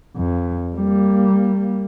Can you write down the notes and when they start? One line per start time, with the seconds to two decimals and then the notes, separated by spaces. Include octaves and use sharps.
0.16 F2
0.75 G3 A#3